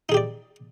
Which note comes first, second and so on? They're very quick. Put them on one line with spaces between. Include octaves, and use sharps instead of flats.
D#4 G#4 G4 D5